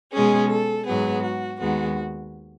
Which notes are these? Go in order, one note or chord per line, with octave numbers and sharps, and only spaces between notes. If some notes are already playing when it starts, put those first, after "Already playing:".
B2 G#3 C#4 G#4
A4
G#2 F#3 B3 G#4
F#4
D#2 D#3 G#3 B3 F#4